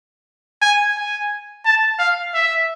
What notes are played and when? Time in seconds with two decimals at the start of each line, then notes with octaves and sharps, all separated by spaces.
0.62 G#5
0.97 G#5
1.65 A5
1.99 F5
2.34 E5